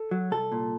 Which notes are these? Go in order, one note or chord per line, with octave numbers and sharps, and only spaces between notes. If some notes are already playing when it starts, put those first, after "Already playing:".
Already playing: A4
F#3
C2 A4
A#2